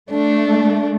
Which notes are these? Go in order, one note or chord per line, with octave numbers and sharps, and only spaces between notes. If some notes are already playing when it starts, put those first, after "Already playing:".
A3 D4